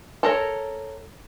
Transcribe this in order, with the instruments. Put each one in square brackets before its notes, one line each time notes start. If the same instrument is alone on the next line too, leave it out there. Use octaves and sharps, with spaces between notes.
[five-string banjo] A4 A#4 C#5